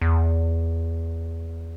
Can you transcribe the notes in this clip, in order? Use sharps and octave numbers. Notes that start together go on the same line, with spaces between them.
E2